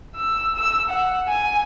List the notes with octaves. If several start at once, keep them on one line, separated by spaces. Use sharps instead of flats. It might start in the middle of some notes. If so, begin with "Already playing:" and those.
E6
E6
F#5
G#5